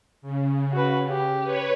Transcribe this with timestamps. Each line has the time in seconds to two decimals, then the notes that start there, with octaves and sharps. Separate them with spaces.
0.22 C#3
0.72 F#4 B4
1.09 G4
1.43 B4 C#5